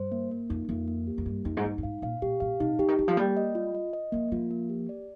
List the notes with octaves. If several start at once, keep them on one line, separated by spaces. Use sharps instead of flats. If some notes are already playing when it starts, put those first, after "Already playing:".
Already playing: G2 C5
A#3
A#3
F2 D#4
F2 A#3
A#3
G4
F2
G2 A#3
F2 D#4
G#2
G2 D#4
G2
G#2 F5
A#2 F5
A#2 G4
A#2 F5
C3 D#4
D3 G4
D#3
D#3 G4
F3
G3 A#3
D#5
F4
D#5
D#5
F3 A#3
F3 F4
A#3
G4
D5